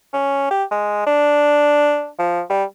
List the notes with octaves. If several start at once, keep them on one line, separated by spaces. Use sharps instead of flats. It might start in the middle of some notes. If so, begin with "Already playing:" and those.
C#4
G4
G#3
D4
F3
G3